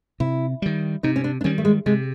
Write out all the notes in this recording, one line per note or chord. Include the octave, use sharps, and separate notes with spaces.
C3 E4
D#3 G3
C3 D#4
C#4
D4
D4
D#3 G3 C#4
A3
G#3
C3 G#3